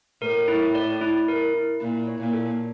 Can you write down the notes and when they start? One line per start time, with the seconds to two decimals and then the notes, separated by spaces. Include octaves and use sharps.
0.22 A2 A#4
0.48 E4
0.75 D5
1.01 E4
1.28 A#4
1.54 E4
1.80 A#2 E4
2.07 C#5
2.20 A#2
2.33 A4